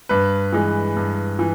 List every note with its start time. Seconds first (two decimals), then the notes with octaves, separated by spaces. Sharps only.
0.09 G2 B4
0.53 E3 G#3
0.96 G2
1.39 E3